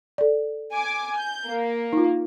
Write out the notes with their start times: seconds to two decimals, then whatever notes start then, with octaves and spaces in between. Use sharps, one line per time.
0.18 A4 D5
0.73 G#5 D6
1.16 G6
1.48 A#3
1.93 D#4 F4